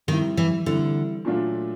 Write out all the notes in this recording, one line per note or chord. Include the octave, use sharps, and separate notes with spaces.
D#3 G3 C4 E4
E3
D3 G3 C4 E4
A#2 F#3 A3 D4 F4